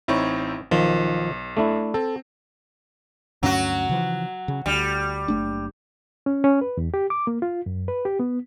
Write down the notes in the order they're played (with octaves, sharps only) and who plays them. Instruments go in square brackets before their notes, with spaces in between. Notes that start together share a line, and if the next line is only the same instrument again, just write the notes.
[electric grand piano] A1 C4 D#4 [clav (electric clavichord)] E4 C#5
[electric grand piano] B1 [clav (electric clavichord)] D#3 F3
[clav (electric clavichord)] A3 D4 E4
[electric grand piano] C4 [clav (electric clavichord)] A4
[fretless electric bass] D2 G2 C#4 [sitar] F#3 F#4
[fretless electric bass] C#3 E3 F3
C#3
[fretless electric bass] D2 [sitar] G3
[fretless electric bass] F#1 A3 D4
[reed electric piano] C#4
C#4
B4
E2
G4
D6
A#3
F4
F#2
B4
G4
B3